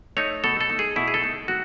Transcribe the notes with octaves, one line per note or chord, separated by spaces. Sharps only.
A3 D#4 C#5
B2 A4
A4
A3 D#4
G#4
B2 E4
G#4
A4
A3 D#4
D#3 F#4